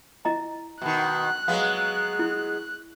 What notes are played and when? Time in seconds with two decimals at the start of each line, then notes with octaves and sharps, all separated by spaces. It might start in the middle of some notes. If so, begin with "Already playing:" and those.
0.25 E4 D#5 A#5
0.82 B2 D#3 F#6
1.48 F#3 G#3 B3 F5
2.19 E4